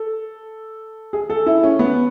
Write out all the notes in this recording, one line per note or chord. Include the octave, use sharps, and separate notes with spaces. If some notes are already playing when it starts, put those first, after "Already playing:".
Already playing: A4
G#4
A4
E4
C#4
B3